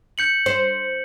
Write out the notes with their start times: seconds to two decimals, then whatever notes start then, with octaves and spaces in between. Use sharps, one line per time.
0.18 G6 C#7 F#7
0.46 C5